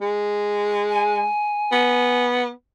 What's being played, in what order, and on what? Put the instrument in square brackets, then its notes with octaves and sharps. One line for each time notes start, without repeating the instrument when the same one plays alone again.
[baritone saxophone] G#3
[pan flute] G#5
[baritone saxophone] B3